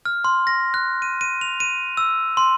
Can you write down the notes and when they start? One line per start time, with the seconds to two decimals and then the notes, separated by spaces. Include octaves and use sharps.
0.05 F6
0.24 C6
0.47 A#6
0.74 F#6
1.02 D#7
1.21 D#7
1.41 F7
1.60 D#7
1.97 E6
2.37 C6